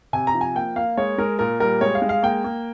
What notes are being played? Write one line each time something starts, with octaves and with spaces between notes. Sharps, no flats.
C3 G#5
A#5
F3
G#5
A#3 G5
A#3 F5
G#3 C#5
G#3 A#4
A#2 A#4
G3 A#4
G#3 C#5
F5
G#3
F5
A#3 G5
A#3